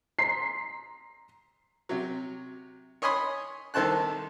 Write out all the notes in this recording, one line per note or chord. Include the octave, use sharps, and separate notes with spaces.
A#5 C6 B6 C7
C3 F#3
C#5 D#5 G#5 B5 C6 D#6
C2 D#3 A4 C5 A5 F#6